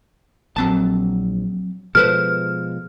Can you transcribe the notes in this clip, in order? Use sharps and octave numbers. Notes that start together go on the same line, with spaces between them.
A#1 F#3 C4 A5
B2 F3 G#3 A4 B4 C5 F6